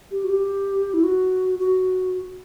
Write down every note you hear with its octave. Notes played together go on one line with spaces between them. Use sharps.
G4
F#4
G4
E4
F#4
F#4